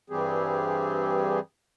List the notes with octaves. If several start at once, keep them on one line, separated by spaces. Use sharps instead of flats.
G2 E3 G3 C4 G4 G#4